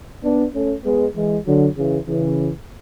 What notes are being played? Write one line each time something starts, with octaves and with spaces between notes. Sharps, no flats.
B3 D4
A3 C#4
G#3 B3
E3 G#3
D3 F#3
C#3 E3
C#3 E3